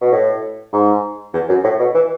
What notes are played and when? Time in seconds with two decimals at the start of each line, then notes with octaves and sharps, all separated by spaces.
0.01 B2
0.12 A2
0.73 G#2
1.33 E2
1.49 F#2
1.64 A2
1.79 B2
1.94 E3